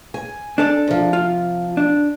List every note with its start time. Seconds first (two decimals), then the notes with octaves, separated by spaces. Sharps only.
0.14 G#5
0.58 D4 A4 D5
0.87 C3 F3
1.13 F4
1.77 D4